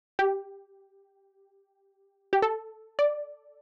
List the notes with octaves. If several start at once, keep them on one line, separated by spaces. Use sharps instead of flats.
G4
G4
A4
D5